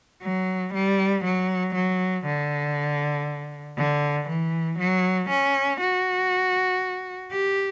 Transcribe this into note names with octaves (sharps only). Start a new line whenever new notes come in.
F#3
G3
F#3
F#3
D3
D3
E3
F#3
C#4
F#4
G4